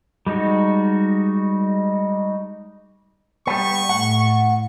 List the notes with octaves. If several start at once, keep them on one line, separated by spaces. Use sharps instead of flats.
G3 G#3 D#4 F#4
G3 B3 C#6
A2 F#5